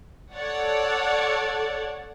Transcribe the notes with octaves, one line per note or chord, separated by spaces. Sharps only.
A4 C#5 D5 F#5